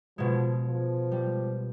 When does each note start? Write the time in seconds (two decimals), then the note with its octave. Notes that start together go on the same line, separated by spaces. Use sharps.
0.18 B2 F3 G#3
0.67 F3
1.11 G3